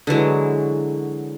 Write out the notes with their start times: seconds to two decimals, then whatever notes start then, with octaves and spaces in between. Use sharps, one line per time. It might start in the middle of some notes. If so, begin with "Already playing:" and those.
0.07 D3 E3 F#3 G#3